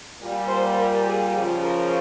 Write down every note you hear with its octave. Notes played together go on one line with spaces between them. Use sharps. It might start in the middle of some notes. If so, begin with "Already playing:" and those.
A#2 G3
C5
A#4
G#4
C#3 F3
A#4